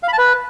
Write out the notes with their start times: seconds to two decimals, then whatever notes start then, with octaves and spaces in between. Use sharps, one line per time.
0.03 F5
0.08 B5
0.13 A5
0.18 B4